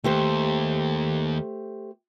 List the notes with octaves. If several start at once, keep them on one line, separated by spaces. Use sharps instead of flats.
D#2 A3 G4 C5